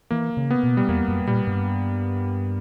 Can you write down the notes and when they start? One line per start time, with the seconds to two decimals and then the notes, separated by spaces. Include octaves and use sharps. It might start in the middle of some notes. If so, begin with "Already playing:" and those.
0.11 E3 A#3
0.37 C#3
0.51 B3
0.64 B2
0.77 G3
0.89 E2 A#3
1.08 F#2
1.27 A#2 G3
1.47 G2